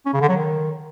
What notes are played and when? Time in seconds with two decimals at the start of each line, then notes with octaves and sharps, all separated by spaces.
0.06 C#4
0.13 C#3
0.21 D3
0.28 F#3
0.36 D#3